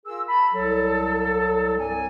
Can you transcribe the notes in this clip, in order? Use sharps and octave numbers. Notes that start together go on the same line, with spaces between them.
F4 G#4 A#4 E6
A5 B5
C2 F#3 A4
C2 G2 F#3 C4 D5 G#5